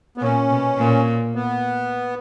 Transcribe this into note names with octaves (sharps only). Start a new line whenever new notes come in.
B3
A#2 C#4
B2
A#2
B3